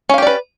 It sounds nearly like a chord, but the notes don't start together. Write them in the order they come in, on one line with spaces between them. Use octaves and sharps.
C#4 F5 G4 D5 B4